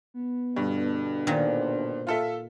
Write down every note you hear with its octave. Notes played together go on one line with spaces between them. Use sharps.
B3
G2 B2 D3 D4
A#2 D#3 C5
F4 A4 E5